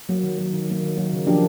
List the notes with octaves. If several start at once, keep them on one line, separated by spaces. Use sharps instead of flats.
F#3 A#3
D#3
F#3 A#3
D#3
F#3 A#3
D#3
F#3 A#3
C#3
F3 A#3 D4 G4